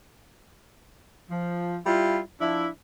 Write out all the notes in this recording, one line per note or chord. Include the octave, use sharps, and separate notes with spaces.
F3
G3 E4 F4
F3 D4 E4